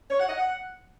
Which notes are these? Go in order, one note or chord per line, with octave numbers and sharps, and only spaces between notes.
C#5
F#5
D#5
F#5